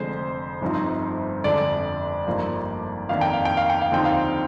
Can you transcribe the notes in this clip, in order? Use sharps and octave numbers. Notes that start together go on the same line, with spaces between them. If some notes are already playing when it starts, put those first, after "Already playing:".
Already playing: F1 F2 D3 G#3 C5
G1 G2 F3 C4 D#4
G1 F2 D3 G#3 D4 D5
G#1 G2 F3 A#3
F2 D#3 A#3 D4 F5
G5
F5
G5
F5
G5
F5
D#2 D3 F3 C4 D#4 G5
F5